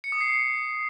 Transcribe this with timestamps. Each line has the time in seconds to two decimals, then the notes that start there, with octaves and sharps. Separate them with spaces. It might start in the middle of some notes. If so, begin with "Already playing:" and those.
0.04 C#7
0.12 D#6
0.21 C7